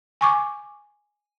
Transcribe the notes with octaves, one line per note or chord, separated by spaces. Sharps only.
G#5 C#6 D6